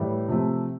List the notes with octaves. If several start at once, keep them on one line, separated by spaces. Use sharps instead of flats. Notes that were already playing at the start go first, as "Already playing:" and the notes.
Already playing: A2 E3 G3
C3 F3 A3